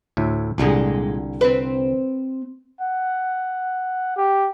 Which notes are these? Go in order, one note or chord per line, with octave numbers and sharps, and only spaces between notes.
D2 A2 E5
C2 A#2 D3 G3 G#3
C4 B4
F#5
G4